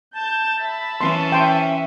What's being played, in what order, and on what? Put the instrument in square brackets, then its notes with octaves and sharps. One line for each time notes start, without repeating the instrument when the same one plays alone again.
[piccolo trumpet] A5 [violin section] G6
[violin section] E5 B5 [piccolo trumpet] A5
[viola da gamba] E3 C#4 [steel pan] C6
[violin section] E5 [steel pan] G5 C6